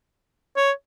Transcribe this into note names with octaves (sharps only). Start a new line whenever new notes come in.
C#5